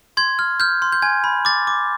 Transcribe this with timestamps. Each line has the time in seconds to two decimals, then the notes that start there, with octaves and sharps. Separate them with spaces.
0.17 C6 G#6
0.39 F6
0.60 F6 G6
0.82 C6
0.92 G6
1.02 G#5 G#6
1.24 B5
1.45 D6 A6
1.67 D6